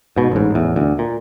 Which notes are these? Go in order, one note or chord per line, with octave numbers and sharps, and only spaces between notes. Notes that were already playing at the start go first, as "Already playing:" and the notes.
G#2 B2
A1 G#2
A1 E2
D2
A#2